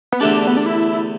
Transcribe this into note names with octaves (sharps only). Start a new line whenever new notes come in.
B3
E2 D3 A3 D4 G4 B4
B3
D4
E4